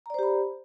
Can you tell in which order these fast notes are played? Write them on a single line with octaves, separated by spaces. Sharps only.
A#5 D5 C5 G4 B5